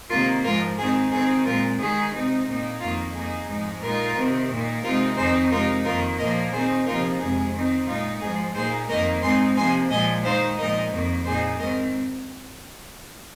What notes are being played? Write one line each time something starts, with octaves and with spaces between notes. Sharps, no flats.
C3 D#3 A#3 F4 A#4
G#2 F3 G#3 F4 A#4
D#3 C4 D#4 G#4
D#3 C4 D#4 G#4
A#2 G#3 C4 F4 A#4
D#3 G#3 D#4 G#4
C3 G#3 C4 D#4
A#2 A#3 D#4
F2 D#3 A#3 D#4 F4
D#3 A#3 D#4 G#4
G#2 F3 G#3 D#4
A#2 G#3 D#4 F4 A#4
C3 D#3 C4
A#2 A#3 D#4
C3 G#3 C4 D#4 F4 A#4
F2 D#3 C4 D#4 G#4 C5
C3 G#3 D#4 F4 A#4
F2 D#3 A#3 F4 A#4
A#2 F3 A#3 A#4 D#5
D#3 C4 D#4 G#4 C5
C3 F3 A#3 D#4 F4 A#4
F2 C3 G#3 G#4
D#3 C4 D#4
A#2 G#3 D#4 F4
G#2 F3 G#3 G#4
A#2 A#3 D#4 G#4 C5
F2 D#3 A#3 D#4 A#4 D#5
G#2 G#3 C4 D#4 G#5 C6
C3 F3 A#3 G#5 C6
A#2 F3 G#3 D#5 G#5
D#3 G#3 D#4 C5 F5
A#2 F3 G#3 D#4 A#4 D#5
F2 D#3 A#3
A#2 A#3 D#4 G#4 C5
G#2 D#3 C4 A#4 D#5